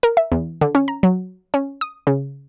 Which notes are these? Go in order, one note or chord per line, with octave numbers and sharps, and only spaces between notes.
A#4
E5
E2
D3
C#4
A#5
F#3
C#4
D#6
C#3